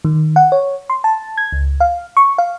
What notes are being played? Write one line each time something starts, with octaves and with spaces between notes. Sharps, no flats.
D#3
F#5
C#5
C6
A5
G#6
C#2
F5
C#6
F5